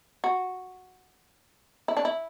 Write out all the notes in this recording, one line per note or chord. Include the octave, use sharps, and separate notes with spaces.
F#4
E4
D4
E4